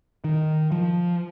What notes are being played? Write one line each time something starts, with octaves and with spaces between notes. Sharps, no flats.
D#3
F3